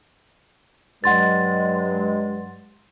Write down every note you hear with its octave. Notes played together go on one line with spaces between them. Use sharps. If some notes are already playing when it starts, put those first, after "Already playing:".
G2 F#3 G#3 F#5 C6 A6